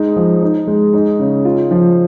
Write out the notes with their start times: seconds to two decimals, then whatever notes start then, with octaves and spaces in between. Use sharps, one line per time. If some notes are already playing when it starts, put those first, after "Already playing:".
Already playing: G#3 D#4
0.16 F3
0.42 D#4
0.67 G#3
0.93 D#4
1.19 C#3
1.45 F4
1.71 F3